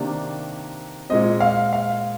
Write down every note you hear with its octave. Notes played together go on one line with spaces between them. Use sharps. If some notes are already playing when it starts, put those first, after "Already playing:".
Already playing: C3 D#3 A#3 D4
A#2 G#3 C4 D#5
F5
F5